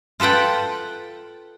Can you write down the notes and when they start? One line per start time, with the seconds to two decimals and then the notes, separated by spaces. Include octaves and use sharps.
0.20 F4 A4 B4 F#5 G5